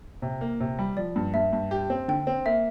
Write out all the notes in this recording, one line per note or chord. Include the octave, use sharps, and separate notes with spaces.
C3
A#3
C3
G3
F3 D5
G2
G2 E5
G2
G4
C4
D3 G5
C4
A#3 E5